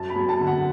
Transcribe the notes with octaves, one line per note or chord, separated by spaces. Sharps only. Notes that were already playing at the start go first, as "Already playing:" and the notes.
Already playing: F#2 A5
B5
F#2
A5
D3
F#5